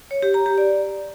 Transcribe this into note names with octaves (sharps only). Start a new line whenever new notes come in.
C#5
G4
A#5
G4
D5